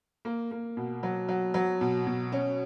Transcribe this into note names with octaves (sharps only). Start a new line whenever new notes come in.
A#3
A#3
B2
F#3
F#3
F#3
B2
B2
C#4